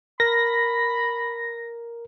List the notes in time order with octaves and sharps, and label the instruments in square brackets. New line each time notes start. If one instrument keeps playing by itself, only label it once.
[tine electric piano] A#4 [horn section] B5 [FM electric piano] A#6